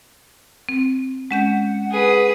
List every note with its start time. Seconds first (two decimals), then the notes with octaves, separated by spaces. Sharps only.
0.69 C4
1.31 G#3 C#4 F#5 G6
1.91 G#4 B4